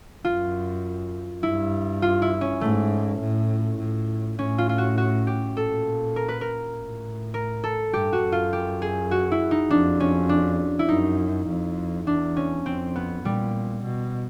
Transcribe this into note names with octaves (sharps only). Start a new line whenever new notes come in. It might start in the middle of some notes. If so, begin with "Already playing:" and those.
F#2 F4
G2 E4
F4
E4
C#4
G#2 A3
A2
A2
A2 C#4
F4
F4
F#4
F#4
G4
A#2 A4
A#4
B4
A#4
A2
A#4
A4
G2 G4
F#4
F#2
F4
G4
G#4
F#4
E4
D#4
F2 D4
C#4
D4
E4
F#2 D#4
F2
E2 D4
C#4
F2 C4
B3
A#2 G3
B2